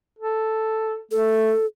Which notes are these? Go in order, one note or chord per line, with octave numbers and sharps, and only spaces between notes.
A4
A3 A4